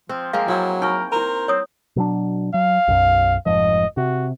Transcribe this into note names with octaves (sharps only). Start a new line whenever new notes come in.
F3 C4
G#3 A#3 C4 F5
F#3 E4
D#4 A#4 G5 C#6
E4 A#4 C5 A#5
C4 C#5 D#6
B2 F#3 D4
F#3 F5
B1 F#2
F1 G#2 F3 D#5
C3 F#4